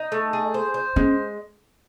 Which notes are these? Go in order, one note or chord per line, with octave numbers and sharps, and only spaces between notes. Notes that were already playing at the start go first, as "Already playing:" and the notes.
Already playing: D#4
A3
G#4
C5
C5
G#3 C#4